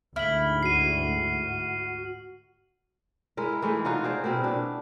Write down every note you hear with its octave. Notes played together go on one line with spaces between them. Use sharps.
D2 G#2 E4 F6 F#7
F#4 C7 D#7
G#3 E4 A#4
E3 G#3 A3 D#4
D#4 F4 F#4
F#4 G#4 C5 D5
B2 C4 E4 A#4
B2 D4